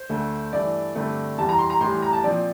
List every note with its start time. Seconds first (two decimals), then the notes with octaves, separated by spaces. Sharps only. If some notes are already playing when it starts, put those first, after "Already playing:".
Already playing: C5
0.09 D2 D3 A3
0.52 G2 E3 A3 D5
0.95 G2 D3 A3 C4
1.38 E2 E3 G3 A5
1.49 A#5
1.59 C6
1.70 A#5
1.81 A2 E3 G3 C6
2.02 A#5
2.13 A5
2.24 A#2 F3 C4 D5